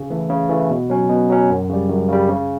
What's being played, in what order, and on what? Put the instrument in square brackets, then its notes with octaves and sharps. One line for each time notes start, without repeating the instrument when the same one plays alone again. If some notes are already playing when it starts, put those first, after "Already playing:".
Already playing: [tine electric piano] C#3
E3 A3
C#3
E3 A3
B2
F#3 C#4
B2
F#3 C#4
F#2
C#3 G3
F#2
C#3 G3
C#3